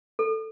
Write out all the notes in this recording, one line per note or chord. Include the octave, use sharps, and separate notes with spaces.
A4